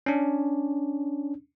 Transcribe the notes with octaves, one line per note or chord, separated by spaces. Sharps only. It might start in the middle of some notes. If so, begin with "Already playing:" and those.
C#4 D4